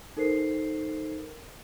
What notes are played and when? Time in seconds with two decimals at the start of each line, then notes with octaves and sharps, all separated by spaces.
0.17 D#4 A4 A#4 C5 C7